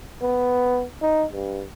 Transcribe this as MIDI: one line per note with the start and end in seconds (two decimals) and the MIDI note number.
0.21 0.84 59
1.02 1.24 63
1.33 1.63 43